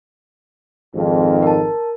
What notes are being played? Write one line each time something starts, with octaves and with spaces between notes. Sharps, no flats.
G#1 F2 G#2
A#4 A5